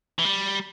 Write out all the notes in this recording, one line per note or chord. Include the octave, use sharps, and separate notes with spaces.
E3
G3